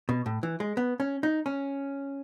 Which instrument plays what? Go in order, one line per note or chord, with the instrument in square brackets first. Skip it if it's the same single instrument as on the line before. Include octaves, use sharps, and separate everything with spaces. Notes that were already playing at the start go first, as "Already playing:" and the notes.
[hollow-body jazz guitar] B2
A2
E3
G#3
B3
C#4
D#4
C#4